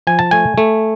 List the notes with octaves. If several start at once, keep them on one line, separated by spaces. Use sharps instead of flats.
F3 G#5
A5
A3 G#5
A3